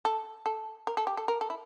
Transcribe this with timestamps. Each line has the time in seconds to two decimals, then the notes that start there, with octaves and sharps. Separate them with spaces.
0.05 A4
0.46 A4
0.87 A#4
0.97 A4
1.07 G4
1.17 A4
1.28 A#4
1.41 A4
1.50 E4